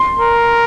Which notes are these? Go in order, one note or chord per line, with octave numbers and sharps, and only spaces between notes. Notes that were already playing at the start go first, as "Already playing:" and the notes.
Already playing: C6
A#4